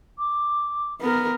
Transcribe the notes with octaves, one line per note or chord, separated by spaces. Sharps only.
D6
B3 A#4